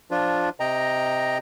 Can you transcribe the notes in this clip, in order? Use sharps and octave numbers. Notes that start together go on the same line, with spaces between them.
F3 D4 F4
C3 D#5 G5 A#5